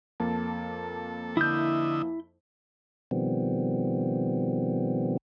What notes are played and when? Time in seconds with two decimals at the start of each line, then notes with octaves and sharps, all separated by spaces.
0.20 F2 A#3 A4 A5
1.37 D3 E4 D#5 E5 G6
3.11 B2 D#3 F3 G3 B3 C4